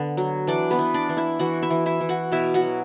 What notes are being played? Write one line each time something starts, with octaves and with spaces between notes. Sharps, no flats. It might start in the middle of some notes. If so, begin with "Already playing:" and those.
Already playing: D3 B3
F#3
E3 D4 D5
B3 B4
E3
D4 D5
E3
E4 E5
E3 F#4 F#5
E4 E5
E3
E4 E5
E3
F#4 F#5
B2 E4 E5
F#4 F#5
F#3